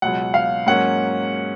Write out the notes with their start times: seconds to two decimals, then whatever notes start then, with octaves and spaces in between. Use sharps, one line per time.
0.02 C#2 B2 F#3 F#5
0.34 F5
0.67 G#2 F#3 A#3 C#4 F#5